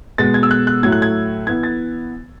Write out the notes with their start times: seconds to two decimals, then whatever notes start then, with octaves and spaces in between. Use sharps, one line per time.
0.18 B2 G#3 B3 A6
0.34 G#6
0.43 E6
0.51 F#6
0.67 F#6
0.83 A2 F#3 A3 G#6
0.92 F#6
1.02 G#6
1.47 E3 B3 G#6
1.63 A6